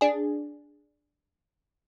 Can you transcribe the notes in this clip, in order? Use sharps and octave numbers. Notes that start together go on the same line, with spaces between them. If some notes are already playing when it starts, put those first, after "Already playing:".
D4 G#4